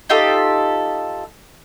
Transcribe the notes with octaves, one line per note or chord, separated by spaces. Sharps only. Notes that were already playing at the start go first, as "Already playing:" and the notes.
D#4 F4 G4 A4